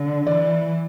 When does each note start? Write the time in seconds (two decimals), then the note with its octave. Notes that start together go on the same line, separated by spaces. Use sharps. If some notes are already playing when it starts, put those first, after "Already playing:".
Already playing: D3
0.26 E3 D5